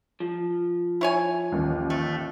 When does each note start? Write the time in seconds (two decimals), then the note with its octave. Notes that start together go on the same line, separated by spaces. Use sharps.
0.20 F3
1.01 E4 C#5 G#5
1.52 A1 D#2
1.90 A3